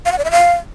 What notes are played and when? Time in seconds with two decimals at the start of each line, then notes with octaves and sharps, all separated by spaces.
0.06 F5
0.12 F#5
0.18 D5
0.25 E5
0.31 F5